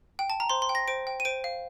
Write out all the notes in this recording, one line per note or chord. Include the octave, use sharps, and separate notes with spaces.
G5
A5
A#5
C5 C6
C6
G5
A#6
C5 D7
G5
D#7
C5 D7
F5